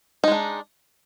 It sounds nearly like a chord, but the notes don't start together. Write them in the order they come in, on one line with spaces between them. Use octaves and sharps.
D#4 G#3 D4